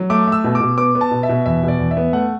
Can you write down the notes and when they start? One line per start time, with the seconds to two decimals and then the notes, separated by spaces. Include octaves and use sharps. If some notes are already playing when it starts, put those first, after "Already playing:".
Already playing: F#3
0.10 A3 D6
0.27 A3 E6
0.44 B2
0.55 D6
0.60 B2
0.78 B3 D6
0.95 B3
1.01 A5
1.11 B2
1.23 E5
1.29 B2
1.46 E2 E5
1.63 B2 D5
1.80 E2
1.91 E5
1.97 B3
2.13 A3 F#5